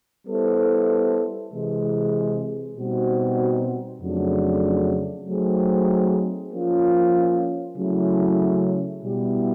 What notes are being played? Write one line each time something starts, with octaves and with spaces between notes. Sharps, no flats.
G3 B3 E4 A4 C5
C3 E3 G#3
B2 G3 C4 D#4 F#4
F2 C#3 F#3 A3 D4
F#3 A3 C4 D#4 G#4
F3 A#3 C#4 F4
C#3 F#3 A3 C#4 E4
B2 G3 B3 E4 G4